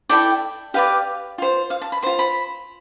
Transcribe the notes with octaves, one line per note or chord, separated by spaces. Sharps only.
E4 A4 D5 G5
G4 B4 D5 F5
F4 C5
F5
A5
B5
F4 C5 C6
B5